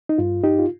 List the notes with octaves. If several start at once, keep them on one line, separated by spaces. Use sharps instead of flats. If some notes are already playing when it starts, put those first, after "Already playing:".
D#4
G2 F4
G2 D#4 G4
F4